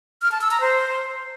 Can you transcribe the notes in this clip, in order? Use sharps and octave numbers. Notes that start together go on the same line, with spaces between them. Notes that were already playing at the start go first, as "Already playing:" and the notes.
F6
A5
E6
A#5
C5